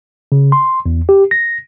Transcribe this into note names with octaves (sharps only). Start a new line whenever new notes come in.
C#3
C6
E2
G4
A#6